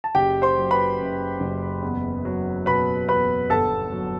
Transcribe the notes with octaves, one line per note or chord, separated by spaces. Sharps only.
A5
F#1 G4 G5
C5 C6
F#3
B4 B5
F#2
F#1
E2
F#3
B2 B4 B5
E2 B4 B5
G1 A4 A5
F#3